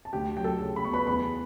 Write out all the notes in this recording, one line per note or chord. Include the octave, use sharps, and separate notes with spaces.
A5
D2 G4 G5
F#3 G5
A4 A5
C#3
B5
B3 C#6
B4 B5
E2 B4 B5